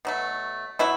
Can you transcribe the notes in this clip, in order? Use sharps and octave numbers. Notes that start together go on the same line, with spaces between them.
B2 F#3 A3
B2 F#3 E4